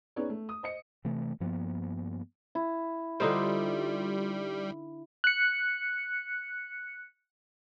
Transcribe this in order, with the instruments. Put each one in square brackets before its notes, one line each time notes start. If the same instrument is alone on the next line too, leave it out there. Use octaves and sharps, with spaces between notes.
[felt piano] B3 C#4 D#4 G#4 C#5 D5
A3
D#6
C5 D#5 C#7
[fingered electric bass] C3 E3 A3
G2 F3 A#3 B3
[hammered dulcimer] E4
[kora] D3 D#4 C5 [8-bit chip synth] G3 [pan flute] F4
[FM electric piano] F#6 C#7